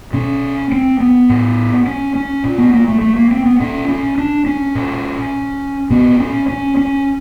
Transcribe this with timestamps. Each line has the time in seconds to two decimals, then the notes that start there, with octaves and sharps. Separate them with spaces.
0.13 B2 C#4
0.72 C4
1.00 B3
1.29 A2
1.86 C#4
2.15 C#4
2.44 A#2
2.58 B3
2.74 A#3
2.88 A3
3.01 A3
3.17 A#3
3.31 C4
3.46 B3
3.60 A#2 C#4
3.88 C#4
4.18 D4
4.46 C#4
4.75 A#2
5.90 A#2 B3
6.20 C#4
6.48 C#4
6.77 C#4